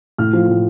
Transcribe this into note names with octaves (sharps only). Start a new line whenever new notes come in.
A2 F6
F3
A2